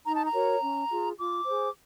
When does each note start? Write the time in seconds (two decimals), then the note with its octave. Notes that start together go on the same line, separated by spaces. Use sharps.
0.05 D#4 A#5
0.15 A5
0.26 A#5
0.33 F#4 A#4 C#5
0.61 C#4
0.90 F4 G#4
1.17 F4 D6
1.45 G#4 C5